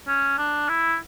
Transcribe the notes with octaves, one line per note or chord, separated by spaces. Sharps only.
C#4
D4
E4